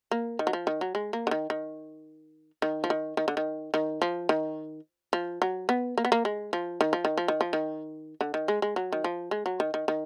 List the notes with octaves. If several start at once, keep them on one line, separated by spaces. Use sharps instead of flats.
A#3
D#3
F#3
F3
D#3
F#3
G#3
A#3
D3
D#3
D#3
D#3
F3
D#3
D#3
D3
D#3
D#3
F3
D#3
F3
F#3
B3
A#3
B3
A#3
G#3
F3
D#3
F3
D#3
F3
D#3
F3
D#3
D3
D#3
G#3
G#3
F#3
D#3
F3
G#3
F#3
D#3
D#3
D#3